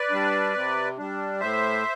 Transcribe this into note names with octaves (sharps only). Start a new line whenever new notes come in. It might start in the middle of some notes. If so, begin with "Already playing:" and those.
Already playing: B4 D5
G3 D4
C3
G3 D4
A2 C5 E5